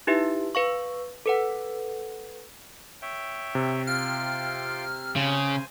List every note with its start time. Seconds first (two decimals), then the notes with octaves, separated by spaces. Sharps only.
0.07 D#4 E4 G4 B4 E5
0.55 B4 F5 C#6
1.26 A4 B4 F#5
3.02 C#5 E5 G5
3.55 C3
3.87 F4 F5 G5 F6
5.16 C#3 C5 G#5